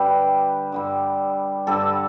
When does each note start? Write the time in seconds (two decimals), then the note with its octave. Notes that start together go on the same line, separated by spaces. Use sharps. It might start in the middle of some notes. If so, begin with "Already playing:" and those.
Already playing: G2 D3 G3 G4 B4
0.72 G2 D3 G3
1.67 G2 D3 G3 A4